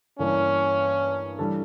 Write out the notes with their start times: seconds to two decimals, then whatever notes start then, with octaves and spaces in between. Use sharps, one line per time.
0.19 G2 E3 A#3 C#4 D4
1.39 E3 G3 D4 A4